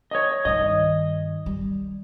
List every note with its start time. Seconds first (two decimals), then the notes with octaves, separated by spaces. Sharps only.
0.11 C#5 D#5
0.45 G2 D#3 D#5
1.46 G3